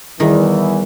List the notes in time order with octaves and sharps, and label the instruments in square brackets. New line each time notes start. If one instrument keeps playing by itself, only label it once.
[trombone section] E2 E3 [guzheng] D#3 A#4 [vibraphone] G3